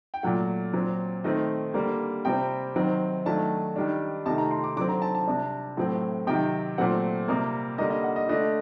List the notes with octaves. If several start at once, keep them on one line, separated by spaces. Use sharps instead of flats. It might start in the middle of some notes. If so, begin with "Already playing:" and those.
G5
A#2 F#3 A3 F#5
A#2 F#3 C4
D#3 A3 C4 D#5
D3 G3 A#3
C3 G3 C4 G5
D#3 F#3 C4
D#3 F#3 A3 D4 A5
D#3 G3 D4
C3 D#3 A3 A5
A#5
C6
D6
D3 F#3 C4 D6
A#5
A5
A5
C3 G3 D4
A2 F#3 A3 C4
C3 D#3 F#3 G5
A#2 F#3 A3 C4 F#5
C3 G3 A#3
D3 G3 A#3 D#5
D#5
F#5
D#5
D3 A3 D4 D#5